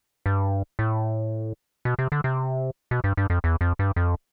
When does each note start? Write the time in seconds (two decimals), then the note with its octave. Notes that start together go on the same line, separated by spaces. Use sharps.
0.26 G2
0.79 A2
1.85 B2
1.99 C3
2.12 D3
2.24 C3
2.91 B2
3.04 G2
3.17 G2
3.30 F2
3.44 E2
3.61 F2
3.79 G2
3.96 F2